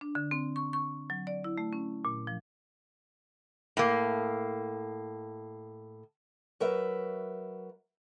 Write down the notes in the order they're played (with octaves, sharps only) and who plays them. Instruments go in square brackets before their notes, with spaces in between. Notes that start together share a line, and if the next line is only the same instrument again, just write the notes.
[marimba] D4
D3
C4
C#6
C#6
F#3
D5
E4
A3
C#4
A#2
F3
[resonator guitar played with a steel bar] A2 A#3
[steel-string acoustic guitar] F#3 A#4 B4 E5